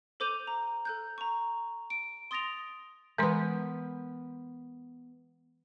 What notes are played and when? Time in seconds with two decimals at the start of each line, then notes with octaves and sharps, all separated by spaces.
0.20 A4 C5 D6 G6 D#7 F7
0.47 A#5
0.85 A4 F#6 G6
1.18 A#5 C#6
1.90 D7
2.31 C6 D#6 A6 A#6 D7 F7
3.18 E3 G#3 B3 A#4 C6